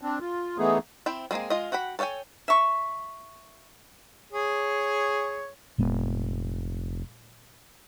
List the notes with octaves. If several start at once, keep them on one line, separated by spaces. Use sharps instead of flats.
C4 D4
F4
E3 A3 B3 D#4 G#4
C4 E4 G5
G3 G#3 A#3 C4 G#4
G#3 F4 D#5
F#4 F#5 G5 B5
A4 C#5 F5 G5 G#5
E5 C#6
G#4 C#5
F1 A#2 G#3 B3